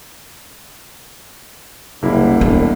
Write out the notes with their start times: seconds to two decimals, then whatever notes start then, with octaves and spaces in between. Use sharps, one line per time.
2.02 F#1 C2 A#3 E4
2.41 E1 D4